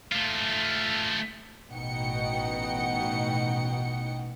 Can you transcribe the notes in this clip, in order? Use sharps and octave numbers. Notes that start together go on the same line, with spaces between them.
A3 F4
A1 B2 D#4 F#5 G5 C#7